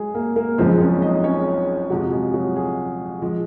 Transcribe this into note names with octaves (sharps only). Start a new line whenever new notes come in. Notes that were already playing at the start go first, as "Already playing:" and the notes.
Already playing: F#3 G#3 G#4
A#3 A#4
A#3 A#4
F#1 F2 C#3 F3 G#3 C4 C5
C#4 C#5
D#4 D#5
C#4 C#5
F2 C3 F3 F#3 G#3 F#4
G#3 G#4
F#3 F#4
G#3 G#4
F3 G#3